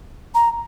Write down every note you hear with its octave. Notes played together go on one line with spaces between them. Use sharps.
A#5